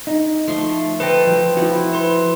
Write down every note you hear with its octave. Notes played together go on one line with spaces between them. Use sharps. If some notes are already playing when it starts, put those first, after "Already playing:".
D#4
F3 A3 C6
A4 B4 C5 D#5 G5
F3
F3 E4 F#4
B4 C6